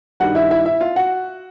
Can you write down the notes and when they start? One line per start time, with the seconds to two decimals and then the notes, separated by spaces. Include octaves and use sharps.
0.20 G2 D#3 G3 F#4 F#5
0.35 E4 E5
0.51 E4 E5
0.65 E4 E5
0.81 F4 F5
0.96 F#4 F#5